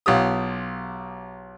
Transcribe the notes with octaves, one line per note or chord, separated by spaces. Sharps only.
B1 F4 G4 D#6